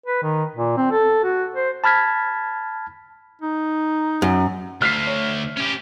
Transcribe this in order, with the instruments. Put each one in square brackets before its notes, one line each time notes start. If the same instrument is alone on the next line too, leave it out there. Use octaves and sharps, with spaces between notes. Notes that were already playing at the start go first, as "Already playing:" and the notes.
[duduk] B4
D#3
A#2
C4
A4
F#4
C5
[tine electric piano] A5 B5 F6 G#6 B6
[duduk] D#4
[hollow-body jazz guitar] F#2
[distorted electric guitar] D2 [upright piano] F6 B6 C7
[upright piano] C#5
[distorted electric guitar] C#4 G4